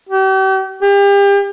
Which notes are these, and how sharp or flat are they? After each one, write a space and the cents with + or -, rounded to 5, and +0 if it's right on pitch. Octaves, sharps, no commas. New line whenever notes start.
G4 -40
G4 +35